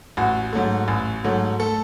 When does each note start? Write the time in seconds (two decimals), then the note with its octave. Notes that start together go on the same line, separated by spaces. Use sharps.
0.17 A1 F#4
0.53 G#2 F#3 A3
0.88 A1
1.24 G#2 F#3 A3
1.60 A3 A4